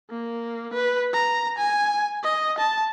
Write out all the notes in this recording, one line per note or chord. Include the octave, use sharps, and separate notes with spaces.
A#3
B4
A#5
G#5
D#5
A5